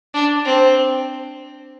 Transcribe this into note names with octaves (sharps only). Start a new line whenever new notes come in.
D4
C4